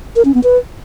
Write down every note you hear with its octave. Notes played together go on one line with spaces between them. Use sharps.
A#4
C#4
B3
B4